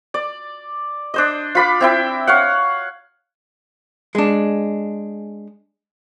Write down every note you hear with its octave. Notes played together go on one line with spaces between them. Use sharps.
D5
D4 C5 D#5
F4 B5 D6
C4 E4 G5
C#5 F5 F#5
G#3 D4